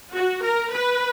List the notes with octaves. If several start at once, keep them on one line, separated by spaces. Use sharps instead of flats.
F#4
A#4
B4